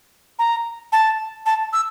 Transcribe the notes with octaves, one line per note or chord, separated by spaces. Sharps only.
A#5
A5
A5
E6